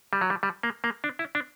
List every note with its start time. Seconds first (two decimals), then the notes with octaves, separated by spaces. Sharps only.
0.13 G3
0.21 F#3
0.30 G3
0.43 G3
0.63 A#3
0.84 A#3
1.04 D4
1.19 E4
1.35 D4